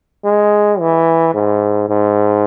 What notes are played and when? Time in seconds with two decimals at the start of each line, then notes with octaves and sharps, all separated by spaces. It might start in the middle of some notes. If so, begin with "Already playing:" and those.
0.24 G#3
0.80 E3
1.34 G#2
1.89 G#2